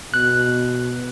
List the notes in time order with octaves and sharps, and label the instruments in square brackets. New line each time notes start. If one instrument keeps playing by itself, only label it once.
[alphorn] B2 [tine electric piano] F#6